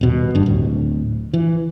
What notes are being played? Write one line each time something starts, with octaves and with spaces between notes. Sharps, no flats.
D#1 B2
G1 G2
D1
E3